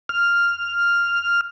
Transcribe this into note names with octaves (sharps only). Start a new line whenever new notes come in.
F6